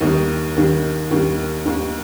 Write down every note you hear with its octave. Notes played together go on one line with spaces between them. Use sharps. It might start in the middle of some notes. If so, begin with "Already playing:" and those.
D#2 D#3 G3 D#4
D#2 D#3 G3
D#2 D#3 G3
D#2 D#3 G3